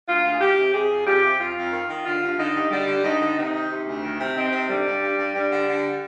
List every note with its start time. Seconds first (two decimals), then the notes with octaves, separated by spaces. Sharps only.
0.08 D2 F4
0.24 D2
0.32 G#4
0.40 D#3 G4
0.57 C3
0.74 C3 G#4
0.91 F2
1.06 F2 G4
1.23 C3
1.39 F2 F4
1.57 F2
1.72 D#3
1.88 D#3
2.05 D3 F4
2.22 G2
2.39 D3 D#4
2.55 G2
2.71 D3 G3
2.87 D3
3.04 G2 D#4
3.21 D3
3.37 C3 D#4
3.53 D#3
3.70 C3
3.87 D2
4.03 D#3
4.20 C3
4.35 D#3 C4
4.52 C3
4.69 D3 G3
4.86 G2
5.02 G2
5.18 G2
5.34 G2 G3
5.51 D3
5.68 D3